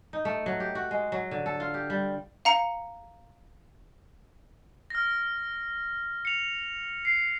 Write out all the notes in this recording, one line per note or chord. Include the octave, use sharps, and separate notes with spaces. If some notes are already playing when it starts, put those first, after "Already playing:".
D#4
A3
F#3
G4
F#4
G#3
F#3
D3
A4
F4
G4
G3
F5 A#5 C#7
F6 A#6
C#7 F7
C7